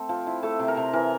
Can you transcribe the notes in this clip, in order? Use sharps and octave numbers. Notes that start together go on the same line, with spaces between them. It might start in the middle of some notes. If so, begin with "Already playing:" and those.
Already playing: A3 C4 A4
F3
E4
A3 A4
C3
A#4
C3
E3 A#4